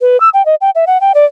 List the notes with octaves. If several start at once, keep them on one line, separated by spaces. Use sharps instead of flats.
B4
E6
G5
D#5
G5
E5
F#5
G5
D5